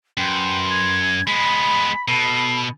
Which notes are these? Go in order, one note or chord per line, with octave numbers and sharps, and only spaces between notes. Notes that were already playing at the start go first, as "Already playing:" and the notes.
F#2 B4 G5 C6
G#6
G#3 B3 B5 B6
B2 A4 B5 C7